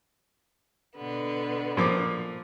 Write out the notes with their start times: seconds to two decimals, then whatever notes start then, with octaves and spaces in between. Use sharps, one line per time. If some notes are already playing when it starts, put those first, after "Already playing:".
0.97 B2 D3 B3
1.77 A#2 F3 D6